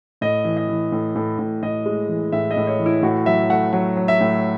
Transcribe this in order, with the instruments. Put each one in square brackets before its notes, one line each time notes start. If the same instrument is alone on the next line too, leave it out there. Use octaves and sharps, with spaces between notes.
[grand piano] A2 D#5
E3
D#5
E3
A2
A2
A2
A2 D#5
G#3
E3
A2 E5
D#5
A2
C#5
E3
E4
A2 F#4
F#3 E5
A3 F#5
F#3 F#5
F#3
E5
A2